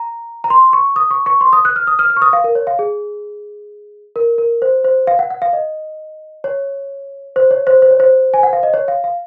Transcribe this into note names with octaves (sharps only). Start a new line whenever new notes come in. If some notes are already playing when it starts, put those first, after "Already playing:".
Already playing: A#5
A#5
C6
C#6
D#6
C#6
C#6
C6
D#6
F#6
F6
D#6
F6
F6
C#6
D#6
F5
A#4
C#5
F5
G#4
A#4
A#4
C5
C5
F5
F#5
F#5
F5
D#5
C#5
C5
C#5
C5
C5
C#5
C5
G#5
F#5
F5
D#5
C#5
F5
F5